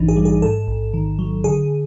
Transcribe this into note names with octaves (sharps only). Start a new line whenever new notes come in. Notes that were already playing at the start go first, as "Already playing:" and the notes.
Already playing: A#1 G#2 E3 D4 D#4
G#4
G3
G#4
G#2 A4
A1
D#3
F#3
D3 G#4